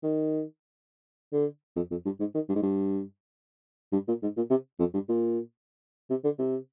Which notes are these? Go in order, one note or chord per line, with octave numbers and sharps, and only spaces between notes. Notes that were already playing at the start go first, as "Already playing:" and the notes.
D#3
D3
F2
F2
G2
G#2
D#3
G2
G#2
G2
G2
A#2
G#2
A#2
C3
F2
G2
A#2
C3
D3
C3